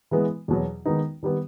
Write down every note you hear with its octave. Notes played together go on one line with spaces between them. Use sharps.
E3 G#3 B3
E2 B2 F#3
D#3 G#3 B3 D#4
D#3 G3 B3